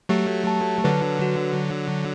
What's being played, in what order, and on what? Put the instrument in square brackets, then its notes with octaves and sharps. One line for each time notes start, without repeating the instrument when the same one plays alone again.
[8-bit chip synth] F#3 A3 [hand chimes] G4
[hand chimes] A5
[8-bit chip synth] D3 F#3 [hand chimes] B4
[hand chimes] F#4